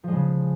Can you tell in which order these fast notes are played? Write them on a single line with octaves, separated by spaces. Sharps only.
F3 G#3 C#3